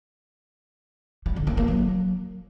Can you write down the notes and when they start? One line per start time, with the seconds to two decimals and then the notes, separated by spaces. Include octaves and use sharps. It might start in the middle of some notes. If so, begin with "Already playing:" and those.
1.26 G3
1.36 D3
1.47 A#3
1.57 A#3
1.68 F#3